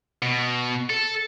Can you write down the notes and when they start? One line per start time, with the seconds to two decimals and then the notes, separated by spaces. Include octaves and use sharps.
0.22 B2
0.90 A4